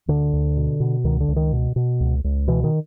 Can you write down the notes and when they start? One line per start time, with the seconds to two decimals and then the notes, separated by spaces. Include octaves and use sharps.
0.08 D2 D3
0.33 D2
0.57 B2
0.80 B2
1.04 C#2 D#3
1.20 D3
1.28 C#2
1.36 D#3
1.53 B2
1.76 B2
2.00 C#2
2.24 C#2
2.48 B2 E3
2.64 D#3